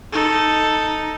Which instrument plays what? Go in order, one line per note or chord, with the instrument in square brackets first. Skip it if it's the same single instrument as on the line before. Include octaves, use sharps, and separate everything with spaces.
[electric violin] D#4 A4